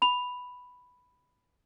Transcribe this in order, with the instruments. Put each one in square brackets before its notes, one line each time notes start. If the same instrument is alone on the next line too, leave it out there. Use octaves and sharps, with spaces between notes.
[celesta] B5 F7